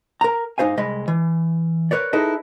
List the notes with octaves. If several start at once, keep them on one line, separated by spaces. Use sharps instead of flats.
A#4 A#5
G#2 D#4 F4 C5 F5 G#5
C2 G#3 D#5 B5
E3
A#4 B4 C#5 D5
D#4 E4 G#4 A4 B4 D#5